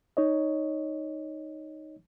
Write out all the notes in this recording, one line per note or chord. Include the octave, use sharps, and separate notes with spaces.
D#4 C#5 D#5